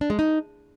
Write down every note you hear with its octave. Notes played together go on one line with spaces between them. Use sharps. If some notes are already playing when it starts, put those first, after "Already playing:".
D4
G#3
D#4